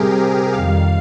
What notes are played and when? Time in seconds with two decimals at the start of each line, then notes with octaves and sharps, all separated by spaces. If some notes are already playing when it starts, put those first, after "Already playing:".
Already playing: C3 G3 C4 G4 G#4 A#4
0.53 F2 D#3 G3 F5